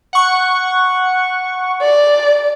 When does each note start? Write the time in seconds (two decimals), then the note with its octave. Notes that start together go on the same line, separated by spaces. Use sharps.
0.13 F#5 C#6
1.81 D5